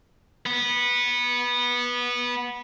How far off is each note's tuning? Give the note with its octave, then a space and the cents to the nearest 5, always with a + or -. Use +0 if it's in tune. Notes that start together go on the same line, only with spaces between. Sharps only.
B3 -15